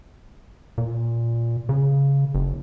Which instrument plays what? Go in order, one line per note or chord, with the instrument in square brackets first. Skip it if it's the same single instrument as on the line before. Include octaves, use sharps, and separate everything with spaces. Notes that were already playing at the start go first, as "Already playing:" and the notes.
[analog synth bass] A#2
C#3
F#1